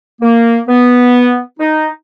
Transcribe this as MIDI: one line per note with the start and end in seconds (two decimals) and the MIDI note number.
0.21 0.59 58
0.69 1.39 59
1.59 1.87 63